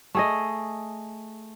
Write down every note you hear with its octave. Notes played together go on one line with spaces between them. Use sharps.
A3 G#4 D#5